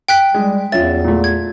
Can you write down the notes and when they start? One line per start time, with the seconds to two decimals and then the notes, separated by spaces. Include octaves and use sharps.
0.09 G5 F#6 B6
0.34 G3 G#3
0.72 E2 F3 C#4 E5 A6
1.04 A#2 A3
1.24 G#6